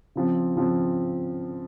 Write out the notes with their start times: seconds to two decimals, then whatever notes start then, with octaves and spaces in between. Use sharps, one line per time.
0.15 C#3 F3 C4
0.55 C#3 F3 C4